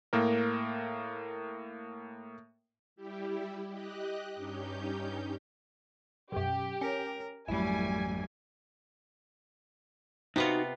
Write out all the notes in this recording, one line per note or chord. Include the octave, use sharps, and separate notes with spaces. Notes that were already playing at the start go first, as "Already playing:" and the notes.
A2 A#3 A#4
G3 E4 G4
G4 D#5 F#6
G2 C#4 D#4 G4 G6
B1 F#2 G4
C#4 A#4
G#1 F2 F#3 G3 A3 E4 G#5
C3 B3 D#4 F4 F#4